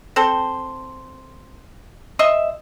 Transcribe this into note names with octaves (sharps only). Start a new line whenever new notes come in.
C4 A4 C5
C5 D#5 E5